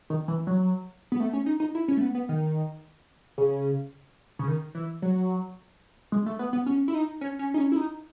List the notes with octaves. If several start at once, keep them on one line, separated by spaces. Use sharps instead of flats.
D#3
E3
F#3
B3
A3
C#4
D#4
D#4
E4
C#4
A3
B3
B3
D#3
C#3
C#3
D#3
E3
F#3
G#3
A3
B3
B3
C#4
E4
D#4
C#4
C#4
D#4
C#4
E4
D#4